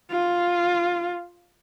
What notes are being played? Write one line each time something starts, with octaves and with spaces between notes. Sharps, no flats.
F4